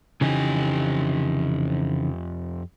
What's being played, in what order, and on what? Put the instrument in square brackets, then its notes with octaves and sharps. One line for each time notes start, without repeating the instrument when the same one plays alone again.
[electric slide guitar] F2 G4 G#5 [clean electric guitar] C#3 E3 D#4